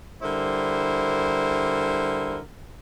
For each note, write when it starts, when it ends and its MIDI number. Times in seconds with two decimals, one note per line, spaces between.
0.22 2.39 50
0.22 2.39 55
0.22 2.39 64
0.22 2.39 70
0.22 2.39 72